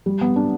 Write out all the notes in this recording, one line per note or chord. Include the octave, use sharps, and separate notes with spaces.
G3
B3
D4